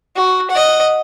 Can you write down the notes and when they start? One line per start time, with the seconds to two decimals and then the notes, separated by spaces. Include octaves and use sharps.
0.16 F#4
0.50 D#5 F#5